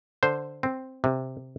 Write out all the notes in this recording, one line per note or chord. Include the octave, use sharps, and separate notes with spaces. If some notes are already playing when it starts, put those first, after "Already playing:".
D3 C5
C4
C3